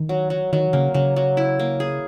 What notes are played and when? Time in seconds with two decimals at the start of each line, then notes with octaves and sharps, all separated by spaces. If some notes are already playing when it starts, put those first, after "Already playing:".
Already playing: D#3
0.09 F#3
0.30 F#3
0.53 D#3 F#3
0.73 C#3 A#3
0.94 C#3 F#3
1.16 F#3
1.37 E4
1.59 A#3
1.80 G#4